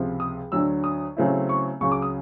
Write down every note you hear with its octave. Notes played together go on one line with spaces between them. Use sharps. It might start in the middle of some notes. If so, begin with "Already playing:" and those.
Already playing: C#2 C3 F3
D#6
D2 D3 F#3 E6
D#6
C#3 F#3 A3 C4 E4
C#6
C#2 C#3 F#3 C#6
D6
D#6